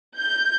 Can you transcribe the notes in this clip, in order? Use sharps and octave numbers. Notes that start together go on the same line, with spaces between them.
G6